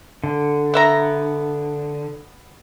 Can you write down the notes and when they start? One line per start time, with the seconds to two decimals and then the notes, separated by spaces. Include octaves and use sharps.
0.24 D3
0.74 B3 E5 A#5